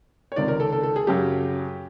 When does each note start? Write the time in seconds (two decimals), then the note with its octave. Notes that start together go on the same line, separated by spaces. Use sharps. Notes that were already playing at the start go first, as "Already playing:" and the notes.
0.32 C#5
0.36 C#2 C3 D#3 D5
0.48 A#4
0.60 A4
0.73 A4
0.83 A4
0.96 G#4
1.07 F#2 C#3 F#3 G4